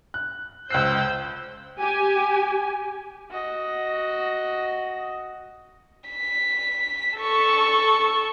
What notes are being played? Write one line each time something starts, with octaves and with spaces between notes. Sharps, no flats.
F#6
C#2 C5 E6 F#6 G6 C7
G4 G#5
F#4 D#5
B6
A4 C#6